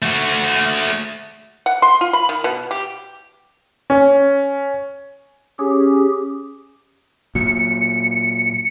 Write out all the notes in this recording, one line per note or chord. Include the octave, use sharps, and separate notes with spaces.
A3 F#4
F#5
C6
F4
B5
D#3
B2
G4
C#4
C#4 G4 G#4
A#2 F#3 C#7